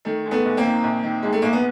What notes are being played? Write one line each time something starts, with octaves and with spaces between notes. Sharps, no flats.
D#3 A3
G#2
A3 B3
A#1
A#3 C4
D#3
A#1
D#3
G#2 G#3
A3
A#1 A#3
B3